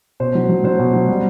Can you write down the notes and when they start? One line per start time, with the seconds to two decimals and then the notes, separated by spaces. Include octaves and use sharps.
0.20 B2 C5
0.35 F#3
0.49 F#3
0.64 F#3 C5
0.79 B2
0.93 F#3
1.08 G3